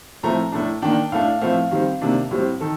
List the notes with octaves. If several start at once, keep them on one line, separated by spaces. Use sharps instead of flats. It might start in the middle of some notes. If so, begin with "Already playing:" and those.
A2 F3 A3 C4 A#5
A2 A3 D4 A5
D#3 A#3 D4 G5
A2 A3 D4 F5
A2 F3 A3 C4 F5
D#3 G3 C4
C3 D#3 A#3 D4
A2 G3 C4
D#3 A4